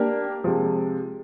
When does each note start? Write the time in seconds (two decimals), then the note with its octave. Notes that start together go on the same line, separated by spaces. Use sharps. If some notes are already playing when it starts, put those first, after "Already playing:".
Already playing: A#3 D4 G4 A#4
0.44 C3 F3 G#3